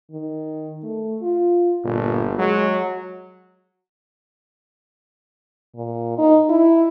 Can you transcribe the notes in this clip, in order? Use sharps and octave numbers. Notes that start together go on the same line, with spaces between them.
D#3
A3
F4
G1 A#2
F#3 G#3
A#2
D#4
E4